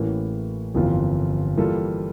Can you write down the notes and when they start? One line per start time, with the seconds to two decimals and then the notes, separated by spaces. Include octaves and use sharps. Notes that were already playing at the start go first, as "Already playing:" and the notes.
Already playing: A1 A2 E3 A#3
0.74 G1 F2 E3 A#3 F4
1.57 E3 G3 A#3 F4 A4